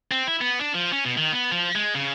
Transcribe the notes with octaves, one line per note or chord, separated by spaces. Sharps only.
C4
E4
B3
D4
F3
C#4
B2
D#3
B3
F3
G#3
C#3